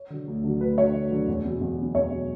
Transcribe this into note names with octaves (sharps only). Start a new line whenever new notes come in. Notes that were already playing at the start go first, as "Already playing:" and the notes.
Already playing: C#5
D3 F#3
D2
D3 F#3
D2 B4
D3 F#3 C#5
D2
D3 F#3
E2
B2 F#3
E2
B2 F#3
E2 C#5
B2 F#3